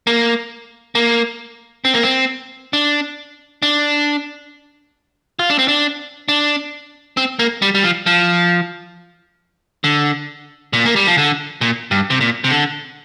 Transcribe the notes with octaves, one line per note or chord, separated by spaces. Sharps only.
A#3
A#3
C4
A#3
C4
D4
D4
F4
D4
C4
D4
D4
C4
A#3
G3
G3
F3
F3
D3
A#2
A#3
G3
F3
D3
A#2
G2
C3
A#2
C3
D3